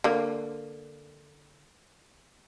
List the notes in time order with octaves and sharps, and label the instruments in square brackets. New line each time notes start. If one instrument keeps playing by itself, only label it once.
[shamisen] D3 A#3